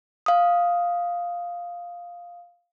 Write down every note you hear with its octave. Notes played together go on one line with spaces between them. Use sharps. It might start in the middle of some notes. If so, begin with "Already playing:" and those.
F5 D#6